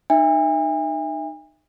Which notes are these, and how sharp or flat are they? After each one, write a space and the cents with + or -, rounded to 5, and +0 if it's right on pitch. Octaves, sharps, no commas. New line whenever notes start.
D#4 -30 E5 +0 G#5 -45